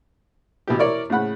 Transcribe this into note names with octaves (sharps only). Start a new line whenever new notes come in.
B2 E3 G4
E4 A#4 C#5 D5
A2 C#3 F#5 B5